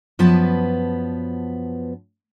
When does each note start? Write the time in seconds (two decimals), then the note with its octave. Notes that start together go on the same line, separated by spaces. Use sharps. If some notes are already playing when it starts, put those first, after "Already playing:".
0.19 F#2 F3 B3 B4 A5